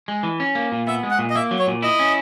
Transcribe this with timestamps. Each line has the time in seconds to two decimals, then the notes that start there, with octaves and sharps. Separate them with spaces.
0.08 G#3
0.23 E3
0.40 C#4
0.55 A#3
0.72 A#2
0.87 B3 E5
1.03 G#3
1.11 F#5
1.19 A#2
1.30 D#5
1.35 A#3 E5
1.51 F#3
1.59 C#5
1.67 A#2
1.82 E4 D#5
1.99 C#4